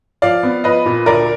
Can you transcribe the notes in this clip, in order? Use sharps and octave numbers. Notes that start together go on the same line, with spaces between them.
F3 D5 F5
B3
F3 B4 D#5
A#2
D2 A#4 D5